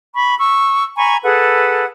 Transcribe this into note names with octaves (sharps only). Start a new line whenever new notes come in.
B5 C#6
C#6 E6
G#5 A#5 B5 C#6
G#4 A4 B4 F#5